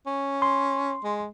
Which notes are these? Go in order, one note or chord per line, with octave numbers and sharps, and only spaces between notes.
C#4
C6
G#3